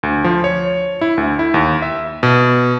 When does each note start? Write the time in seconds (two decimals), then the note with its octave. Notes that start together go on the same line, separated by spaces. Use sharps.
0.03 D2
0.24 F3
0.44 C#5
1.01 E4
1.18 D2
1.39 E4
1.54 D#2
1.82 E5
2.23 B2